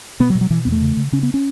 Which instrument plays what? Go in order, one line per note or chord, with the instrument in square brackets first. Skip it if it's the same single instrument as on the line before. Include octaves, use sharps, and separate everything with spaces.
[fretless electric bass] B2 B3
F#3
B2
F#3
B2 E3
E2 B3
A3
C#3
C#3
C#3 C#4
B3
C#4